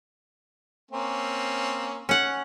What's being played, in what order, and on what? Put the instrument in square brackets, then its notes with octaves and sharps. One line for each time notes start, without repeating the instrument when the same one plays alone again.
[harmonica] A#3 C4 C#4
[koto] C#4 F#5